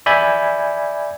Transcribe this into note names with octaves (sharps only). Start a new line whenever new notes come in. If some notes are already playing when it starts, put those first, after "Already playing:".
D5 E5 G#5 B5 G6 G#6